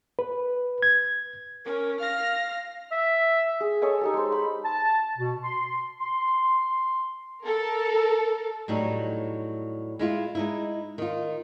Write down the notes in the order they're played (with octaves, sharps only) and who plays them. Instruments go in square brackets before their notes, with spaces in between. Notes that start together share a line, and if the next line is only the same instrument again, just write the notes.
[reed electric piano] B4
G#6
[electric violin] C#4 [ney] A#4
[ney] F5 [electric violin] F6 A#6
[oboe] E5
[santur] G#4
A4 C#5 D#5 G#5
D#4 G4 A4
G#3 C5
C5 B5
[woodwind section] A5
B2
C6
C6
[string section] A4 A#4
[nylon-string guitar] A2 F#3 G3 D#4
G#3 E4 F4
G#3 D#4 E4
D#3 F4